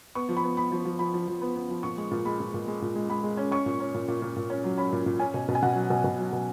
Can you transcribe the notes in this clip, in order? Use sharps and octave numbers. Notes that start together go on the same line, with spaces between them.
B3 C#6
F3
B5
B3
B3 B5
F3
F3
F3 B5
F3
F3
B3
B3
F3
A#2 C#6
G#3
A#2
G#3 B5
A#2
A#2
G#3
A#2
G#3
G#3 B5
G#3
C#4
C#4 C#6
A#2
C#4
A#2
A#2
A#2
A#2
C#4
F#3
C#4 B5
A#2
A#2
C#4 G#5
B2
B2
G#5
B2 F#5
F#3
B2
B2
F#3
B2